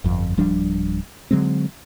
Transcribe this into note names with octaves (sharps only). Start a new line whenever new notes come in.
G1 F2
D1 F3 G3 D4
D3 F#3 G#3 C4